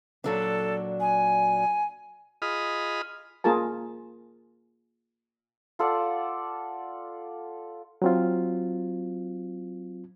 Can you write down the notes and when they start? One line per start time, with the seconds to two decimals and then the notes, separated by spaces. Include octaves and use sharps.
0.24 A#2 F#3 D4 A4
1.00 G#5
2.42 F4 G#4 D#5 B5 D#6 F6
3.44 A#3 F4 G#4 A#4 A5
5.79 F4 A4 D5 F#5
8.02 F#3 C4 F4